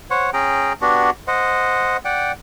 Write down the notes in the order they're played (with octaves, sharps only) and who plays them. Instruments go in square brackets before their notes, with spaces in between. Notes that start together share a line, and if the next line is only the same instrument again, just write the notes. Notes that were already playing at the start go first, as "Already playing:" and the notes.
[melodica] C5 C#5 F#5
C#4 G#4 G5 A#5
B3 D4 F#4 G4
C5 D#5 F#5
D5 F#5 G5